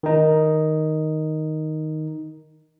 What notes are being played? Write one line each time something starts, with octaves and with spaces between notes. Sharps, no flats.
D#3 D#4